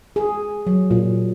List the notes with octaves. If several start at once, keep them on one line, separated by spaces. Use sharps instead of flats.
G#4
F#3
A#2